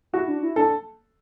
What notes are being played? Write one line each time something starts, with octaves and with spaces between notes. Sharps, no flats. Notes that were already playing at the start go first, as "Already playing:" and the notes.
E4 F#4
D4
E4
D4 A4